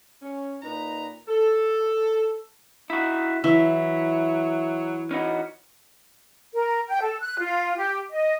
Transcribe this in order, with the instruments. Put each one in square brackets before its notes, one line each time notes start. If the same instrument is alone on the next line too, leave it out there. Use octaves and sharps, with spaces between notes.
[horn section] C#4
A#2 D#4 B4 A#5
A4
[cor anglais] D#4 [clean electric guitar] E4 F#4
[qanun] E3 [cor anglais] F#3 [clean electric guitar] E5
[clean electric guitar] C#4 D#4 F#4 [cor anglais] B4
[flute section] A#4
G5
A4
F#6
F4
G4
D#5